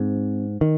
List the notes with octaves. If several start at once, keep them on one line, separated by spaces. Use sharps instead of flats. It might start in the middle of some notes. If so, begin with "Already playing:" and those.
Already playing: G#2 C4
D#3